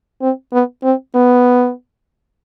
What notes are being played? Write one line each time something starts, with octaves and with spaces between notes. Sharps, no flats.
C4
B3
C4
B3